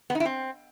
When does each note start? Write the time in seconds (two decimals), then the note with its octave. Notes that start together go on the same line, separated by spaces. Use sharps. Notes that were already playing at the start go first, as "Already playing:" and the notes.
0.10 B3
0.15 D#4
0.20 E4
0.25 C4